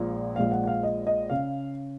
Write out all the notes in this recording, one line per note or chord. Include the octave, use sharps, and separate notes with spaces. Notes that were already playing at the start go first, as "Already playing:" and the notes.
Already playing: A#1 A#2 F3 G#3
A#1 A#2 G#3 F5
F#5
F#5
F5
D#5
D#5
C#3 F5